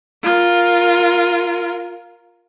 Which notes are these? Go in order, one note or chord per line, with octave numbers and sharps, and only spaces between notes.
F4 A#4